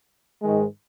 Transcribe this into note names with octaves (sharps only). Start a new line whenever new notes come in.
G#2 D#3 G#3